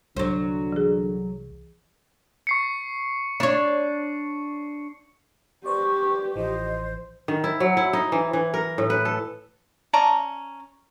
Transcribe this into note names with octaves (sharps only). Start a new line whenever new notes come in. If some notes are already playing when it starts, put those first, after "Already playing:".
C2 D3 F#3 C5
E3 G#4
C#6 C7 C#7
D4 C#5
G4 B4 C5 D5 C#6
A1 E3 F3 C5 D#5
D#3
E4
F#3
E4
D#4
E3
E3
A#4
A2
B4
A4
C#4 D5 A5 A#5